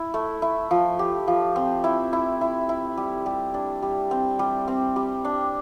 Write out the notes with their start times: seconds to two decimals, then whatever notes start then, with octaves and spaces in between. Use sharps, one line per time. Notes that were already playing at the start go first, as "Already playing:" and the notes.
Already playing: E4
0.14 A3
0.42 E4
0.71 F3
0.99 G4
1.28 F3
1.56 C4
1.84 E4
2.13 E4
2.41 E4
2.69 E4
2.97 G3
3.26 G3
3.54 D4
3.83 G3
4.11 C4
4.39 G3
4.68 C4
4.96 G3
5.25 D4